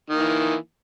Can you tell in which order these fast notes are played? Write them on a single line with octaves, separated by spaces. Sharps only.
D#3 A#3 E3